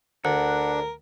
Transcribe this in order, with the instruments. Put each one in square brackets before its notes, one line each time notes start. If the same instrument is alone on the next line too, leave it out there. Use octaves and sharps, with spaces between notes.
[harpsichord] D2 [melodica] D4 [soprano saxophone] A#4 [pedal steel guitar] F#5